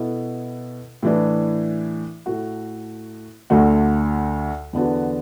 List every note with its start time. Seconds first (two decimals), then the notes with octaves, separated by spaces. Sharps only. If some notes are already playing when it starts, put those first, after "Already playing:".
Already playing: B2 B3 E4 A4
1.03 A2 E3 D4
2.26 A2 A3 F#4
3.50 D2 D3 A3 F#4
4.73 E2 D3 B3 D4 F#4